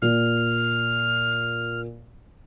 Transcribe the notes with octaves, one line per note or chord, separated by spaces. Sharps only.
A#2 F6